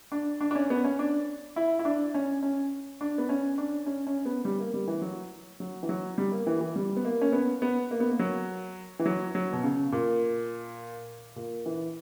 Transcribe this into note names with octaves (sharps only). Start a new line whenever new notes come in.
D4
D4
D4
C#4
B3
C#4
D4
E4
E4
D4
C#4
C#4
D4
B3
C#4
D4
C#4
C#4
B3
G3
A#3
G3
E3
F#3
F#3
E3
F#3
G3
A#3
E3
E3
G3
B3
A#3
C#4
B3
B3
A#3
B3
A#3
F#3
E3
F#3
F#3
B2
C#3
A#2
A#2
E3